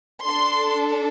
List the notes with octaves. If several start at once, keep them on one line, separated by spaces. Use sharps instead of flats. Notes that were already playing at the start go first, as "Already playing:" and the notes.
D4 A4 C6